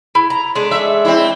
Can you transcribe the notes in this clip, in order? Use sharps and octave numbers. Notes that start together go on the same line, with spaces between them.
E4
A#5
G#3 A3 D4
E5
C4 E4